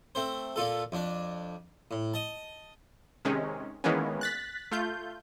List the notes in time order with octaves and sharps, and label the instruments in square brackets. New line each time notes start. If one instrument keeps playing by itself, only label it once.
[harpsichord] A3 C4 C5
A#2 F4 A4
F2 D4
A2
D#5 A5
[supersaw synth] C3 D#3 G#3 C#4
D#3 E3 G#3 A#3 B3 C#4
F#6 A6 B6
A3 F4 G6